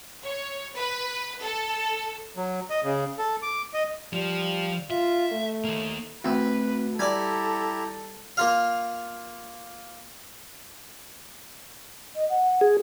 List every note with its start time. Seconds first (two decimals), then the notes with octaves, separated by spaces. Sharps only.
0.24 C#5
0.75 B4
1.43 A4
2.37 F#3
2.70 D#5
2.84 C#3
3.18 A4
3.42 D6
3.74 D#5
4.13 F3 G3
4.90 F4 E5
5.32 A3
5.64 D#2 A#3
6.25 D2 C4 B4
6.99 G3 E4 G4 A4 D5 G#5 A#5
8.37 A#3 F4 F5
12.15 D#5
12.29 F#5
12.61 G#4